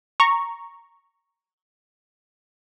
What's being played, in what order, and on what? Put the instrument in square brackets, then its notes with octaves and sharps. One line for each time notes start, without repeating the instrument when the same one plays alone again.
[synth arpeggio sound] A#5 C#6